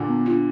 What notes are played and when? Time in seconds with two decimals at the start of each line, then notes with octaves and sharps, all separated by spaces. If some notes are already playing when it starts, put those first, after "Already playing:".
Already playing: A#2 D3
0.08 B3
0.26 D4 F4